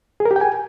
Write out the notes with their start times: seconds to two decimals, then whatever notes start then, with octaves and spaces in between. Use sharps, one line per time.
0.20 G#4
0.25 A#4
0.31 G4
0.36 G5
0.41 G#5